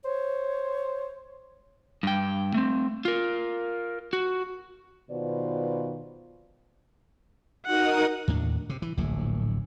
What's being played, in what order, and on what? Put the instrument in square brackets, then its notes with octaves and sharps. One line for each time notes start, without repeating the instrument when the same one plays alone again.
[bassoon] C5 [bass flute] C#5
[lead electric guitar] G2 G5
A3 C4
F4 A#4
F#4
[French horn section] B2 D#3 F4 B4 C5 D5
[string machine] D#4 A#4 D#6 [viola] F#4 F#5
[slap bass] D#2 A2 D4
C3
E3
D1 A#1 A2